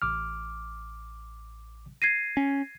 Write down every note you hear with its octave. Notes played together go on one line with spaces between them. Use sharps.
A1 D6 F6
G#6 A#6 C7 D#7
C#4